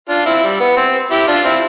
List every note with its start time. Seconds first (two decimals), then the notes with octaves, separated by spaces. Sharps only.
0.09 D4 F4
0.26 C4 E4
0.43 G3
0.60 B3
0.77 C4
1.11 E4 G4
1.27 D4 F4
1.44 C4 E4